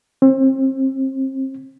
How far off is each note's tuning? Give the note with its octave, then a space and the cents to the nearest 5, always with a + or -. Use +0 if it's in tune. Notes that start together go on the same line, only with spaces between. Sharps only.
C4 +30